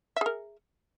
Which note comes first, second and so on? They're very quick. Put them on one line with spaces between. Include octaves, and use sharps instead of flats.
E5 G#4 A#4